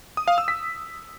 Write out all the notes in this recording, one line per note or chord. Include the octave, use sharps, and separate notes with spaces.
D#6
F5
E6
B6